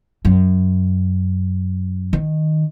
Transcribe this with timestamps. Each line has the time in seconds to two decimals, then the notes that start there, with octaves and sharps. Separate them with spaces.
0.25 F#2
2.13 D#3